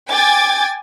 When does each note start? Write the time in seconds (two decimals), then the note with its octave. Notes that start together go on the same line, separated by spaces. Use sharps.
0.12 G5 G#5 D6 G#6 A6